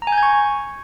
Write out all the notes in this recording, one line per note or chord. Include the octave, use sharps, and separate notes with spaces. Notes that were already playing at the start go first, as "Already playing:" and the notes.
A#5
G#5
G6
G#6
C#6